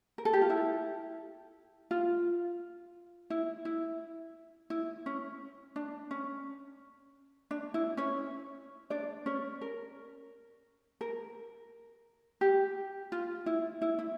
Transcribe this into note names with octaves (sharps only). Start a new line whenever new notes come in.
A#4
A4
G4
F4
E4
F4
E4
E4
E4
C#4
D4
C#4
D4
E4
C#4 C#5
D4 D5
C#4 C#5
A#4
A#4
G4
F4
E4
E4
E4